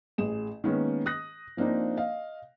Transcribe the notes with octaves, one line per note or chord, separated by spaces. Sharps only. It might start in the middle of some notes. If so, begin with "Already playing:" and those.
A1 G#4 E7
D#3 G#3 A#3 B3 C#4
D#6 F#6 A#6
F3 A#3 C4 D4 D#4
D#5 F5